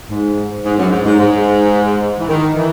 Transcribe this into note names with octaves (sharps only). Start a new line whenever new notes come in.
G#2
G#2
F#2
G#2
G#2
G#2
E3
D#3
E3